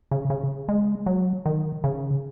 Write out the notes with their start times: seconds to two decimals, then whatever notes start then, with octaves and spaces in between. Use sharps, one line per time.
0.11 C#3
0.30 C#3
0.69 G#3
1.06 F#3
1.46 D#3
1.84 C#3